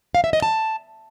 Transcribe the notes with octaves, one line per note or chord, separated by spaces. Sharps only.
F5
E5
D#5
A5